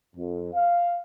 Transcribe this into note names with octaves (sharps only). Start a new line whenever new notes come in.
F2
F5